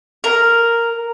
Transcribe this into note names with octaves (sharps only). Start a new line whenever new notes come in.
A#4